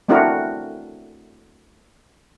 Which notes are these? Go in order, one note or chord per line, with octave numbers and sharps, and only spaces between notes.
A3 C4 D4 E4 F#4 A#4